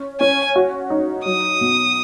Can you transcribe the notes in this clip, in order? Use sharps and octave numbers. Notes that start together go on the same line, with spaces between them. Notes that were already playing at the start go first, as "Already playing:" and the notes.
Already playing: C#4
C#4 G#5
F#4
D#4
F#3 D#6
B2